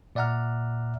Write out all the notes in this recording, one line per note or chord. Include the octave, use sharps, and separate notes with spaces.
A#2 D5 E5 F#5 A#5 F6